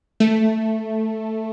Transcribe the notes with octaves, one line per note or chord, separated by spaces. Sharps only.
A3